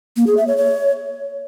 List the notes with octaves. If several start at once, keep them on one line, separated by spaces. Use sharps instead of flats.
A#3
G#4
E5
C#5
C#5